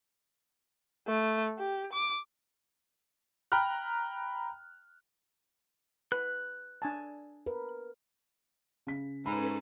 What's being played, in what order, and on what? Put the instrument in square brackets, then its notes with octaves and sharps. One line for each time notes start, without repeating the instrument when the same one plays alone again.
[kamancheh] A3
G4
D6
[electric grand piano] G5 A#5 B5 F6 F#6
[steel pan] B4 [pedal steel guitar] F#6
[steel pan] D4 G#5 A5
[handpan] A#4 B4
[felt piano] C#3 B6
[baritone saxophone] G#2 [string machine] C#4 A4 B4 [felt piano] B5